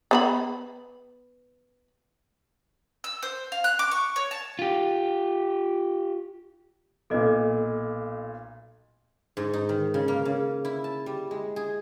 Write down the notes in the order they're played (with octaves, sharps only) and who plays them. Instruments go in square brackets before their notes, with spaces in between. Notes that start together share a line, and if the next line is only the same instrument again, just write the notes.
[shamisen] B3 C5 B5
[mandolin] E6
C5
F5
F#6
D6
C#6
C#5
A5
[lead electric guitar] F4 G4
[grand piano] B1 A#2 [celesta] A4 D#5
[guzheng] G#2
D#4
D#3
C#3
A#3
C#3
E4
A5
G3
G#3
G#4